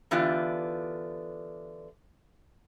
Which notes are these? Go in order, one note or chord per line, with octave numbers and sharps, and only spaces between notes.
D3 E3 B3 D4 F4 G4